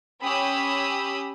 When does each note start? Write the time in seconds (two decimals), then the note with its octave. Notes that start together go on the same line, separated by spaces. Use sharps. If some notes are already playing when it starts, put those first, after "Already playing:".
0.22 C#4 G4 B5 D#6 E6